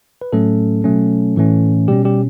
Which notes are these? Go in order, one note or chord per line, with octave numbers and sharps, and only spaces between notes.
B4
A2 F#3 A3 C#4 A4
B2 F#3 A3 C#4
A2 E3 A3 C#4
B2 G3 C#4 G4
G3 G4